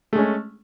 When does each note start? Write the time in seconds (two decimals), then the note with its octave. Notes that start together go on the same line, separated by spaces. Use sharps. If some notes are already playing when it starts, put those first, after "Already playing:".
0.13 A3
0.15 G#3
0.18 C#4